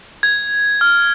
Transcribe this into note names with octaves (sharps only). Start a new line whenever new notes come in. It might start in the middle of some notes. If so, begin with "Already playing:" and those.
G#6
F6